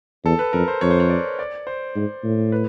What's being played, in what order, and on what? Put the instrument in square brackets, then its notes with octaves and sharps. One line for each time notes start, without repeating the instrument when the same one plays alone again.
[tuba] E2 [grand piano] A4
[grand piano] B4
[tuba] F2 [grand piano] A#4
[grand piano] C5
[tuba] F2 [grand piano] C#5
[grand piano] C5
C#5
D5
D5
C5
[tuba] G#2
A2
[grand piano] B4